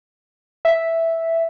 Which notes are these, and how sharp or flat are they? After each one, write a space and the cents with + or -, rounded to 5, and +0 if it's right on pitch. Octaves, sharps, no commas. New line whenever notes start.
E5 -5